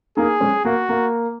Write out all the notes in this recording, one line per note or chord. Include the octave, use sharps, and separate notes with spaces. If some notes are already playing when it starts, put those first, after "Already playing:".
A#3 D#4 G#4
G#3 C#4
A#3 F#4
A#3